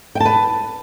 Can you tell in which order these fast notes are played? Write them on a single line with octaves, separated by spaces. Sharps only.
G5 A5 B4